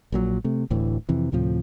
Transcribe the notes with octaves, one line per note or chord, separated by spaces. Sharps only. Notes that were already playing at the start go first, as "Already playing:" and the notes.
A#1 A#2 F#3
C3 A3
D1 D2 A2 E3
F2 C3 E3
D2 A2 C3 F3